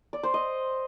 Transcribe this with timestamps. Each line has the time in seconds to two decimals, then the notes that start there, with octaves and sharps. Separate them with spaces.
0.13 D5
0.23 C5
0.34 D#5